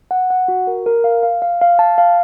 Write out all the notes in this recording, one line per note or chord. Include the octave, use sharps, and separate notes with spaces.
F#5
F#5
F#4
A#4
A#4
F5
F5
F5
F5
A5
F5